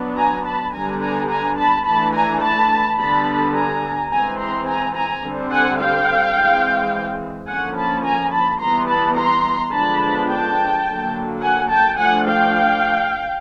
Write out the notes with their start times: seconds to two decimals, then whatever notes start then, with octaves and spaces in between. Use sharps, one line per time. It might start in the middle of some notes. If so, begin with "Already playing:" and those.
Already playing: F#3 B3 D4
0.17 G#5 A#5
0.46 A5 B5
0.74 D3 G3 B3 D4 G#5 A#5
1.02 G#5 A#5
1.29 G#5 A#5
1.58 A5 B5
1.86 E3 A3 D4 A5 B5
2.14 G#5 A#5
2.42 A5 B5
2.99 D3 G3 B3 D4 A5 B5
3.55 G#5 A#5
4.11 E3 G#3 C4 G#5 A#5
4.39 A#5 C6
4.67 G#5 A#5
4.95 G#5 A#5
5.23 D3 G3 C4
5.52 F#5 G#5
5.79 F5 G5
6.36 E3 G#3 C4
7.48 D3 F3 A#3 C#4 F#5 G#5
7.76 A5 B5
8.05 G#5 A#5
8.32 A5 B5
8.60 E3 G3 B3 A#5 C6
8.89 A5 B5
9.17 A#5 C6
9.73 D3 F3 G#3 B3 D4 A5 B5
10.29 G5 A5
10.86 D3 F#3 A#3
11.41 F#5 G#5
11.70 G5 A5
11.98 F3 A3 D4 F#5 G#5
12.26 F5 G5